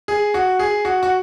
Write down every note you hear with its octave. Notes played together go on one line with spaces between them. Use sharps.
G#4
F#4
G#4
F#4
F#4